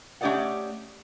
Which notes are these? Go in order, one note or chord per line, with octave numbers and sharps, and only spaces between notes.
A3 C#4 G4 D5 D#5 F#5